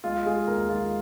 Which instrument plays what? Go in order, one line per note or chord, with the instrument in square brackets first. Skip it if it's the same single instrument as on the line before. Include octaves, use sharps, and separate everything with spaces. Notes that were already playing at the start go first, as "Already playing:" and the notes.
[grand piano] G#3 F4
G#3 G#4
D#2 A#4
G#3 F4